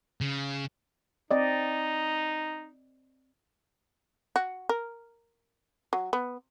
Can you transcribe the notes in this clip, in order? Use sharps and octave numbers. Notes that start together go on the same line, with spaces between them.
C#3
C4 D#4 D5 D#5
F#4
A#4
F#3
B3